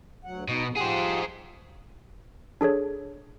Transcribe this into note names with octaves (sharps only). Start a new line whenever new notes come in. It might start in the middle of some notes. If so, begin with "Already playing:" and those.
D2 F#3 F#5
B2 D#4 D#5
F2
F3 G4 G#4 C5 F#5
D4 G#4 A4 C#5